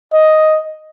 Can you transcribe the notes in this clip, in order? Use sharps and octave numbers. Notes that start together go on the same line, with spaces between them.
D#5